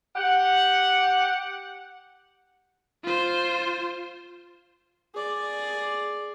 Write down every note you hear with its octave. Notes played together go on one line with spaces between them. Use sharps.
G4 F#5
F4 C5
G#4 D5